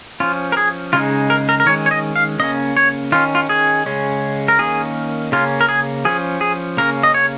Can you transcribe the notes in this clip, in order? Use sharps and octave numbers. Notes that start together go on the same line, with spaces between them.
F3 C#4 F4
A#4
G#4
C#3 G#3 D#4 F4
A#4
A#4
A#4
D#3 G#3 C#4 C#5
C#5
D#5
F5
C#3 A#3 C#4 D#5
C#5
D#3 C#4 F4
F4
G#4
C#3 G#3 C#4
A#4
D#3 A#3 C#4 G#4
C#3 A#3 C#4 F4
A#4
G#4
F3 C#4 G#4
G#4
C#3 A#3 C#4 A#4
D#5
C#5